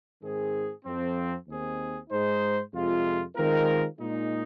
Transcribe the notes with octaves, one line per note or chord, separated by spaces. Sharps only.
G#2 D#3 C4 G#4
F2 F3 C4
D#2 D#3 C4 G#4
G#2 G#3 D#4 G#4 C5
F2 C3 G#3 F4
D#3 G#3 C4 F4 A#4
A#2 G#3 D#4